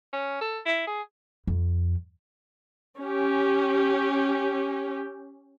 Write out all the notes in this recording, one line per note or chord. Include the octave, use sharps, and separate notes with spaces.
C#4
A4
E4
G#4
F2
C#4 G4